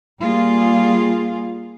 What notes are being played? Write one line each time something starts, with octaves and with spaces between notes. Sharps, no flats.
G3 A#3 F4 G#4